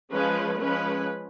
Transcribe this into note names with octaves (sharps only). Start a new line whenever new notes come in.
F3 G#3 C#4 B4
F3 G#3 C#4 B4